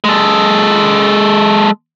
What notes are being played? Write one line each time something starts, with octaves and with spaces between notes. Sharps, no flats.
G#3 A4